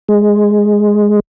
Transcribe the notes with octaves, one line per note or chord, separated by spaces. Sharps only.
G#3